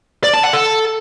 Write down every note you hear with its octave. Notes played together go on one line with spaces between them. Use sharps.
D5
A5
F#5
A4